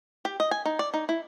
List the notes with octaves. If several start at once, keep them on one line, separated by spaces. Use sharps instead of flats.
G4
D#5
G#5
D#4
D5
D#4
E4